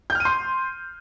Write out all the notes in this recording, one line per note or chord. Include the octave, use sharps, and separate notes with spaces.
G6
F6
D#7
C6